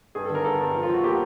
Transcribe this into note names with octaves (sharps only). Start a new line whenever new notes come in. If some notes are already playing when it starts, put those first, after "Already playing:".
G2 G#4
A4
D3 A#4
G2 A4
G2
F3
F4
F3 F#4
A#3 G4